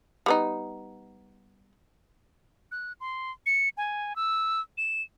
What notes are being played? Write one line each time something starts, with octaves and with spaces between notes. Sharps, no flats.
G3 B3 D#4
F#6
C6
C#7
G#5
E6
E7